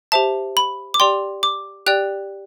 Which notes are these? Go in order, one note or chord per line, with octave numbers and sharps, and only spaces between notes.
G4 C5 E5 A5
B5
D6
G4 D5 G5 C6
D6
G4 D5 G5 F#6